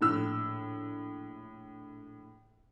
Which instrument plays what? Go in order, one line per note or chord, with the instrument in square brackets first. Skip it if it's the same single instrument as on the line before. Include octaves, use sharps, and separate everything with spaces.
[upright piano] A#1 A2 E6